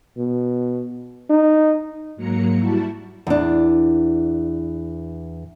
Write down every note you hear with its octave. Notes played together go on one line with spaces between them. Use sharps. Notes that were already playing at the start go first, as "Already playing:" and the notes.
B2
D#4
G#2 F#3 A#3 A#5 C#7
G3 E4 F#4 A5
E2 D4